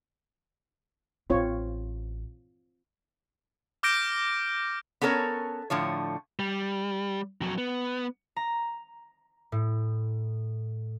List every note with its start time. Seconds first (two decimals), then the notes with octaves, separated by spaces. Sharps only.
1.30 A1 C4 F4 C#5
3.83 D6 F6 G6 A#6 D7
5.01 B3 C#4 A4 A#4 C#5
5.70 A2 D3 F3 C#5
6.39 G3
7.41 F2 F#3
7.58 B3
8.36 A#5
9.52 A2